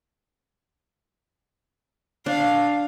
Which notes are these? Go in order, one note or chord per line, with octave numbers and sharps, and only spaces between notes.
D4 F5